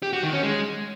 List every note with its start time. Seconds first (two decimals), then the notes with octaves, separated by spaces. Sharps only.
0.03 G4
0.13 F#4
0.23 D#3
0.33 C#4
0.43 G#3